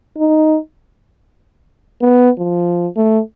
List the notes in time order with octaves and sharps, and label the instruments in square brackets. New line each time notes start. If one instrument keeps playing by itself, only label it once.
[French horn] D#4
[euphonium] B3
F3
A3